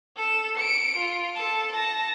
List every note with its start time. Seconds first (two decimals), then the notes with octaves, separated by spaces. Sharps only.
0.16 A4 E7
0.55 C#7 D7
0.97 F4
1.35 A4 A5
1.72 A5 A#6